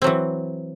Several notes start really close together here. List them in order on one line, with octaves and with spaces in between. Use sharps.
C4 F#3 E3